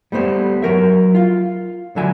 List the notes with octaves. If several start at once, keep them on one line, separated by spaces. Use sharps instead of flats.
G3 A3 B3 C5
F#3 A#4 E5
F4 F5
D3 F#3 E5 G#5